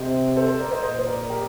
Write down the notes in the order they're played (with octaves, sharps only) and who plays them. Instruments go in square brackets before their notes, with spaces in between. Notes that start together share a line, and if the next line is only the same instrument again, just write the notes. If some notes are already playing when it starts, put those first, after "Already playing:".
Already playing: [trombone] C3 [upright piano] C5 D#5
[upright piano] A4 C5
A4 C5
A#4 D5
C5 D#5
[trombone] A#2 [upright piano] C5 D#5
[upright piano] C5
A#4 D5
G4 A#4